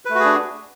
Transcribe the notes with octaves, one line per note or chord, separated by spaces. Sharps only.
A3 D4 F#4 G#4 B4